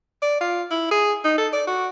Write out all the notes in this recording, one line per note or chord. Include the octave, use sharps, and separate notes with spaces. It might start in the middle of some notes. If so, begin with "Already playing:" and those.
D5
F4
E4
G#4
D#4
A4
D5
F#4